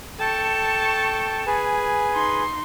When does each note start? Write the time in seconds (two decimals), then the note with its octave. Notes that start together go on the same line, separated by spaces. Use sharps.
0.20 A4 G5 A5 C#6
1.47 G#4 B4 G#5
2.13 D#4 C6